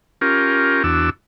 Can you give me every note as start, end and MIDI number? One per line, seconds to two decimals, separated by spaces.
0.21 0.83 61
0.21 0.83 65
0.21 0.83 67
0.21 0.83 70
0.84 1.10 40
0.84 1.10 62
0.84 1.10 66
0.84 1.10 88